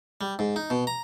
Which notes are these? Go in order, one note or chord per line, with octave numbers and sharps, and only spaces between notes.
G3
G#2
D#4
B2
A#5